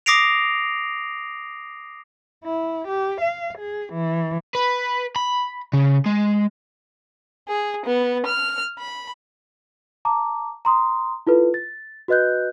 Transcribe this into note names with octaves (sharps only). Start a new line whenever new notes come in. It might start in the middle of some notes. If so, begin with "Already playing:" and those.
D6 D#6 A#6 C7 D7 F7
E4
G4
F5
G#4
E3
B4
B5
C#3
G#3
G#4
B3
F6
B5
A5 A#5 D6
A#5 C6 D#6
E4 F4 A4 B4
A6
F#4 B4 D#5 F#6 G6